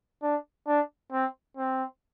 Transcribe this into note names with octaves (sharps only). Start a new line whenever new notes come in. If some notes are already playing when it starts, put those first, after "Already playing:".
D4
D4
C4
C4